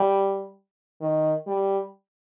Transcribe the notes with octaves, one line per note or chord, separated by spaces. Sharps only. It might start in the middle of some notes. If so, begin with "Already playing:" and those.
Already playing: G3
D#3
G3